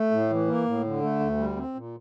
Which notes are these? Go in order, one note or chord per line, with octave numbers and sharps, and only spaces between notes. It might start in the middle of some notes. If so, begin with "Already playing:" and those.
Already playing: A3
A2
E3
A#3
A2
D3
A3
D2
G3
C4
A#2